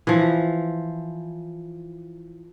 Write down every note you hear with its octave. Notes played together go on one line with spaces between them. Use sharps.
E3 F3